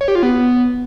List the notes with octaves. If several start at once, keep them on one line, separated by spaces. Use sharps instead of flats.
C#5
G4
F4
B3